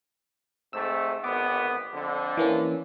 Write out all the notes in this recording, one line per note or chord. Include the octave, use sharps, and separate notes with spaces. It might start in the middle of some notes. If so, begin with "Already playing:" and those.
G#2 C3 A3 E6
G#1 D2 B3 D6
F2 D3
E3 A#3 C#4